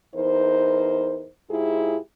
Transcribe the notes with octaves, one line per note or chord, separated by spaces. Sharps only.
E2 D#4 A#4 C5
G#2 E4 F4 G4 G#4